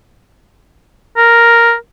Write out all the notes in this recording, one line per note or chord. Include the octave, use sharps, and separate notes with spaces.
A#4